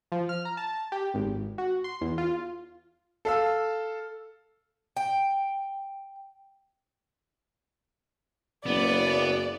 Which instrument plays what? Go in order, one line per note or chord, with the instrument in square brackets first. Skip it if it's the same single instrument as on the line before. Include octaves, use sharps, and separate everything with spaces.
[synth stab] F3
F6
A#5
A5
G4
G#1
F#4
C6
E2
F4
[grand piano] A4 F5 E6
[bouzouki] G5
[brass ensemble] F#1 [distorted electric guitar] B3 [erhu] D5